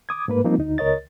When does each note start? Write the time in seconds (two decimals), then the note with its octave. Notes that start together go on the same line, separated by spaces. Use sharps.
0.09 D6 D#6 G#6
0.28 G#2 A#3 B4
0.44 F3 G3 A#3 C4 D#4 F4
0.58 D2 D#4
0.78 C#2 A#4 C#5 D#5 A6